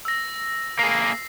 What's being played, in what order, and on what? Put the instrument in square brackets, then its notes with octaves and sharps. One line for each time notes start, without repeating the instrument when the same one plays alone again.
[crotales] E6 A#6
[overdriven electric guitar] A#3 G#4 [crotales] C7